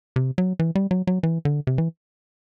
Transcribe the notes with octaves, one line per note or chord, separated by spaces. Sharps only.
C3
F#3
E3
G3
F#3
F#3
E3
D3
C3
E3